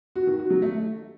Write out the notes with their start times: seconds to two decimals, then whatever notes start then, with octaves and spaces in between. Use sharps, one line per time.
0.16 F#4
0.27 D#3
0.39 F#4
0.50 F#3
0.62 A3